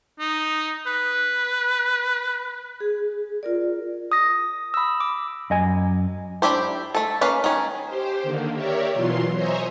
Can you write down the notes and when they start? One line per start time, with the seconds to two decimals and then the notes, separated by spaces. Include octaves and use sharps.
0.20 D#4
0.86 B4
2.80 G#4
3.43 F4 A#4 D5
4.12 D#6 A#6
4.74 B5 E6
5.00 D6
5.50 F#2 D#5 G#5
6.42 D4 E4 G4 C5
6.95 A3 A4
7.21 A#3 C#4 B4 F5
7.44 D#3 C#4
7.85 G4 C5
8.23 D3 D#3 A#3
8.53 G4 A#4 C#5 D5 E5
8.93 B2 E3 F#3 F4 C6
9.33 C5 C#5 D#5 E5 G#5 A#5